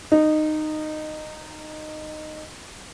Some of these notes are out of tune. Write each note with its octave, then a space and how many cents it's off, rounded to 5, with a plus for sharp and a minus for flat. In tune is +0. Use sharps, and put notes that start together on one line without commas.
D#4 -15